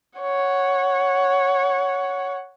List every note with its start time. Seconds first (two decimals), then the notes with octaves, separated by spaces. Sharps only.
0.19 C#5 F#5